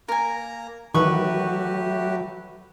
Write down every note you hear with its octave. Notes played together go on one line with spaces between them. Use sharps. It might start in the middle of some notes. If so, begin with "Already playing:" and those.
A#3 A#4 G#5 A#5
D#3 E3 F#3 A3 F#4 G4 B4 C#6